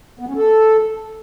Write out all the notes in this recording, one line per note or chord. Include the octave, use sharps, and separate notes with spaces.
B3
C#4
A4